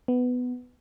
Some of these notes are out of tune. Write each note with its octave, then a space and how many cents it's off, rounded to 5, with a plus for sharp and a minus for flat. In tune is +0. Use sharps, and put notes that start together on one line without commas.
B3 +10